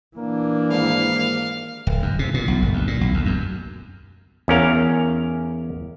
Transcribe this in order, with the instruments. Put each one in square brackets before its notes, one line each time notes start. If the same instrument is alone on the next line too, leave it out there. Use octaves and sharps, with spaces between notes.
[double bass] E3 D4 [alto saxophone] A#3
[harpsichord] D#2 G#2 [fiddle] F5
[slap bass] D1
F#2
C3
A#2
B1
G1
D2
A#2
B1
D2
F#2
[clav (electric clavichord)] E2 C#4 A#4 F5